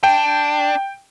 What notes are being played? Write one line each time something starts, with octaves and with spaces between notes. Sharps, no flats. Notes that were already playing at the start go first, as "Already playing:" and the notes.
D4 G5